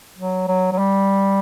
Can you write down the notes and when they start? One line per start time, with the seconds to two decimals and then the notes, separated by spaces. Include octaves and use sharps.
0.18 F#3
0.48 F#3
0.72 F#3
0.78 G3